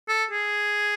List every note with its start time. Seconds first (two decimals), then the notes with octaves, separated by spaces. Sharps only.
0.09 A4
0.31 G#4